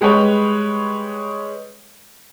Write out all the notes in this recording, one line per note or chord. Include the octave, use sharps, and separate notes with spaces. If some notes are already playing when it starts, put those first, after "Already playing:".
G3 G#3 G4 B4 C#5